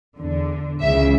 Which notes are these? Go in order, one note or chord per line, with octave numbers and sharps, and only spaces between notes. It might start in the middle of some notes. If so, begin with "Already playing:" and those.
E2 D3
C#2 C#3 E3 E5